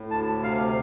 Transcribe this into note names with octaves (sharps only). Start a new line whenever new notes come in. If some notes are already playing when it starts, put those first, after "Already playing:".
Already playing: A2
D2 A5
C3 F5